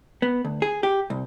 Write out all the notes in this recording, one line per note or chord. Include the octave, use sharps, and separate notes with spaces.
B3
D2
G#4
G4
C2